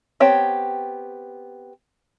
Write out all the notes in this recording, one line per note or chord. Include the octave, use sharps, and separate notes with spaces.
B3 C4 G4 C#5 A5